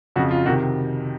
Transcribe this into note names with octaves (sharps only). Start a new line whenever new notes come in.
F2 C#3 F#4
F4
C3 D#3 F#4